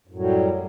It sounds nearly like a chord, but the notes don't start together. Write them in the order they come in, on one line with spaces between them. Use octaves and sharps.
F#2 A2 F#3 G3